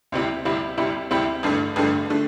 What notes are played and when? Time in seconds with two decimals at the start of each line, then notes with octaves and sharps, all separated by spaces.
0.12 D2 C3 G3 C4 E4
0.45 D2 C3 G3 C4 E4
0.77 D2 C3 G3 C4 E4
1.11 D2 C3 G3 C4 E4
1.43 A1 G2 D3 A3
1.76 A1 G2 D3 A3
2.10 D3 A3